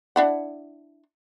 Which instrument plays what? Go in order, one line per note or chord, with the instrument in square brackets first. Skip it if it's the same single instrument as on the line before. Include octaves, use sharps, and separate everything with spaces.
[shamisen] D4 E4 F#5